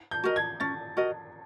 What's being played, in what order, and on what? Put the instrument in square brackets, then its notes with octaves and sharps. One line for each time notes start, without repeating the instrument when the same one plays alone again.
[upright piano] G6
[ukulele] F#4 A#4 D#5
[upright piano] G#6
[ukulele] C#4 [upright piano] A6
[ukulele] F#4 A#4 D#5